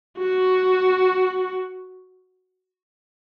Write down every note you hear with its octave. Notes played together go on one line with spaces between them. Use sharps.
F#4